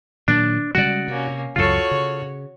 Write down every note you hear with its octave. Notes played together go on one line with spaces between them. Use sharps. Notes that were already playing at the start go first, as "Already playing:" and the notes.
A#2 D#3 F#3 D4
C#3 G3 G#3 F#4 D5
C3 A#3 C#4
C#2 F#2 C#3 F4 F#4 A4 C#5
C#3